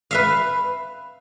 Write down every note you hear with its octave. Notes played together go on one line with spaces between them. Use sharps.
B4 E5 F5